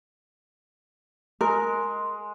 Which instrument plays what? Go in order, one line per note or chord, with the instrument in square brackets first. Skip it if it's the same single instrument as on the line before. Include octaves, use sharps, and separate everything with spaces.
[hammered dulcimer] G#3 [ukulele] A#4